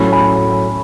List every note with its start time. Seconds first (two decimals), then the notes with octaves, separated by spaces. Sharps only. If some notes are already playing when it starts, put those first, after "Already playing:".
Already playing: A2 F#3 A3 C#4 B5
0.12 G#5 B5